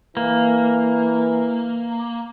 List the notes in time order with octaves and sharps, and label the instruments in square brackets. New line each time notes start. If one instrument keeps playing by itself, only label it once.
[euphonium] E3 [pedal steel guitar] A#3